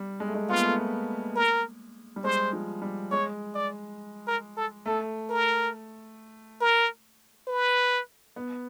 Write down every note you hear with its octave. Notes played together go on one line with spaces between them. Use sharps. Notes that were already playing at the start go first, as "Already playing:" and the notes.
Already playing: G3
G#3
A3
G#3
B3 F4
A#3
A3
A#3
A#4
G3
G#3 C5
F3
G3
G#3 C#5
D5
A#4
A4
A3 A4
A#4
A#4
B4
B3